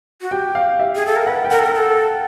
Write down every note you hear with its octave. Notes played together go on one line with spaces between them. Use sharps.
F#4
G4 G5
F5
E5
G#4
A4
A#4
B4 F#5
G5
A#4 F#5
A4
A#4
A4